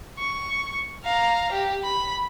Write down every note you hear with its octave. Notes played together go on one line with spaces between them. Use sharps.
C#6
F5 A#5
G4
B5